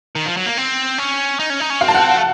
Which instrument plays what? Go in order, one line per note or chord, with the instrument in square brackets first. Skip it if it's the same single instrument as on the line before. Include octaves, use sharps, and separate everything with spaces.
[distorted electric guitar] D#3
F3
F#3
A#3
C4
C#4
D#4
C#4
D#4
C#4
[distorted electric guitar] C4 [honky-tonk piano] F5
[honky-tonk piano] A5
F#5
[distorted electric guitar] A3